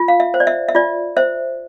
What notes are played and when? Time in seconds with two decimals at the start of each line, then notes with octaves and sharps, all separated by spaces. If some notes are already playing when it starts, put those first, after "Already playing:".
Already playing: F4
0.08 F5
0.20 E5
0.34 C5
0.40 D5
0.47 E5
0.69 E5
0.75 F4 D5
1.17 C5 E5